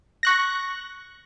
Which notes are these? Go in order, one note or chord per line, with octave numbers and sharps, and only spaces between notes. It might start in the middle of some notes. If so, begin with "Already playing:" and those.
C#6 F#6 A#6